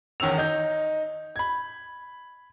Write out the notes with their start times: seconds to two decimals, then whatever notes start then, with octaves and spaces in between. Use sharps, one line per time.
0.20 E2 D#3 C#4 E6 F7
0.38 D#4 G6
1.36 B5 G#6